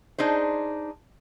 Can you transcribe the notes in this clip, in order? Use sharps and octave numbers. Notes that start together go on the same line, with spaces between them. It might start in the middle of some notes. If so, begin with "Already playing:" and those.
D4 D#4 G#4 C5